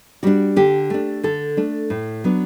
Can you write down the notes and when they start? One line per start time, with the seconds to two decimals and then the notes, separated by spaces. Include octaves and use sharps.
0.23 G3 D4 F#4
0.56 D3 G4
0.90 A3 D4
1.23 D3 A4
1.57 A3 D4
1.90 A2
2.24 F#3 B3 D4